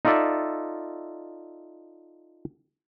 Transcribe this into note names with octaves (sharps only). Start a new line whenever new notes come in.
D#4 F4 A4 D5 E5